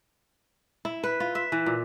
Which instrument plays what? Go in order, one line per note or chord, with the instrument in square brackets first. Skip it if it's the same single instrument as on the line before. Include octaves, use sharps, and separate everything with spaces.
[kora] E4
B4
F4
E5
E3
A#2